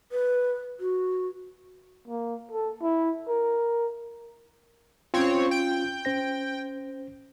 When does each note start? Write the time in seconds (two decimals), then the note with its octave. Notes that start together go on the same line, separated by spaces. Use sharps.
0.12 B4
0.80 F#4
2.08 A#3
2.52 A4
2.83 E4
3.28 A#4
5.14 C4 C#4 F4 C#5
5.51 G5
6.05 C#4 C5 A#6